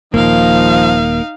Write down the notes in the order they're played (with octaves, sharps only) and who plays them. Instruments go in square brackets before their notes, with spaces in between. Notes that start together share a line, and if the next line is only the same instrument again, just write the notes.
[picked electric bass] D#1 G#1 [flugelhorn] F3 [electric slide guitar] A#3 [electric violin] D#4 F5